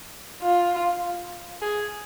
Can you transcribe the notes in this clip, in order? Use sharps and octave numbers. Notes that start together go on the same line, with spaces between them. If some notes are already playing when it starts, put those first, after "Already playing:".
F4
G#4